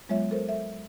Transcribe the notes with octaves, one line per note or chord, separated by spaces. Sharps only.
F#3 G#3 B3 F4 C#5 E5
A4 A#4 C5
A4 E5